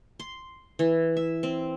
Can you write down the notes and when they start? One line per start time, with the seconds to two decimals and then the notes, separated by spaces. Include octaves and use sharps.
0.20 C6
0.79 E3
1.17 E5
1.43 C4